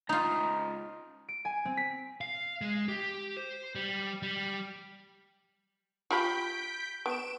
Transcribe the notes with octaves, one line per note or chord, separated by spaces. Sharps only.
C#2 D#4 F4 A#5
D7
G#5
C4
B6
F5
G#3
G4
C5
G3
G3
F4 G4 B5 G6 B6 D7
B3 D7 E7